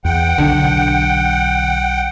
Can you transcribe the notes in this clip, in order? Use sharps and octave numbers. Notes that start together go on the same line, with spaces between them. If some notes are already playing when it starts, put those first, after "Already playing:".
E2 F#5 G5
B1 D3 D4